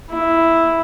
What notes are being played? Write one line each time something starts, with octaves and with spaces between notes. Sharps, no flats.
E4